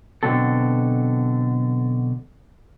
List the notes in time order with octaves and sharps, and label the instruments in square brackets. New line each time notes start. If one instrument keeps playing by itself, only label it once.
[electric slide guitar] B2 D3 E3 F#3 C4 A4